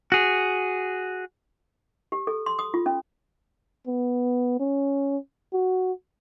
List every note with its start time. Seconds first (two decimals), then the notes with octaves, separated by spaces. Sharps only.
0.12 F#4 G#4
2.12 G4
2.27 A4
2.46 C6
2.59 D#6
2.74 F4
2.86 C#4
3.87 B3
4.60 C#4
5.53 F#4